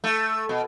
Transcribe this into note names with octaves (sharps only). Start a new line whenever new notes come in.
A3
B2